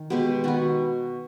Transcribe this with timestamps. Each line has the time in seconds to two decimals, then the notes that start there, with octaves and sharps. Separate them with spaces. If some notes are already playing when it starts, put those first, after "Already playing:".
Already playing: D#3
0.10 B2 G#3 B3 G4
0.44 D#3 G#3 B3 F#4